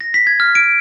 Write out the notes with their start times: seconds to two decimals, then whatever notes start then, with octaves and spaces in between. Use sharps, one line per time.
0.01 A#6
0.14 B6
0.27 G#6
0.40 F6
0.55 D7